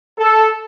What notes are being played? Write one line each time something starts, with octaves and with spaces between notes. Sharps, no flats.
A4